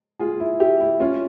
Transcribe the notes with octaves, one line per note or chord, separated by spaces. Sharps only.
F4 G#4
E4
E4 G4
E4
C#4 F4